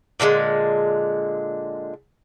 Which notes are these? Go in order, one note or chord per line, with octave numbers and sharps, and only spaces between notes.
A#2 D3 G3 G#3